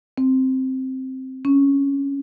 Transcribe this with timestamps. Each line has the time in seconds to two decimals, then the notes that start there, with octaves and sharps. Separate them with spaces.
0.18 C4
1.45 C#4